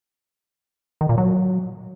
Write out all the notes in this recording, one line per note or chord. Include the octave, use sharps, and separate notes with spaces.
D#3
A#2
F#3